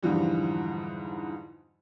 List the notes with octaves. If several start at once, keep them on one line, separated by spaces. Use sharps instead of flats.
F2 G#2 D3 E3 F3 G3